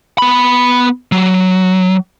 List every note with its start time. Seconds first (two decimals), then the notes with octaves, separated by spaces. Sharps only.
0.18 B3 B5
1.12 F#3